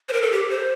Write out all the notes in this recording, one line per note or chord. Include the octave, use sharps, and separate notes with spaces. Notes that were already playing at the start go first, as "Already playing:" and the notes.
C5
A#4
A4
G4
C5